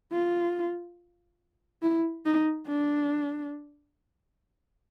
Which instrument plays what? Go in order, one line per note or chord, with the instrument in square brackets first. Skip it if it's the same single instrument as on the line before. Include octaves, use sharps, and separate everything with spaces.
[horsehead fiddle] F4
E4
D#4
D4